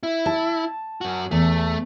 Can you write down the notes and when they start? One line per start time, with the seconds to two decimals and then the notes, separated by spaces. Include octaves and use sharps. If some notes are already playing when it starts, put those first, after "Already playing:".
0.03 E4
0.26 A5
1.01 F#2 F#4
1.31 E2 A3